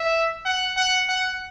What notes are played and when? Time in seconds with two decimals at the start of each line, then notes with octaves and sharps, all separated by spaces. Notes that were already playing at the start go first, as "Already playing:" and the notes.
Already playing: E5
0.45 F#5
0.77 F#5
1.09 F#5